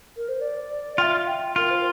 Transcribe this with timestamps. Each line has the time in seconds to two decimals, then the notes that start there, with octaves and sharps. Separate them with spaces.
0.17 A#4
0.29 C5
0.41 D5
0.98 F4 G5
1.02 E5
1.27 G5
1.56 F4 A#4
1.71 C5